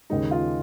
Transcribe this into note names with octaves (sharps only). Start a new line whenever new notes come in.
D#2 C#3 G#3 D#4
F4